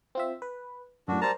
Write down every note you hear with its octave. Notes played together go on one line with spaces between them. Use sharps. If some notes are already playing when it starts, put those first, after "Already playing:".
C4 F4 E5
B4
F#2 A2 D4 F#4
G3 A#4 C5 A5 A#5